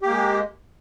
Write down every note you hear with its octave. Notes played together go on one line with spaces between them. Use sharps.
G#3 A#3 G4